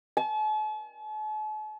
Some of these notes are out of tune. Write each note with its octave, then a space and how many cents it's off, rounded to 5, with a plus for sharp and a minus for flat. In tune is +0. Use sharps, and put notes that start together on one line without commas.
A5 -45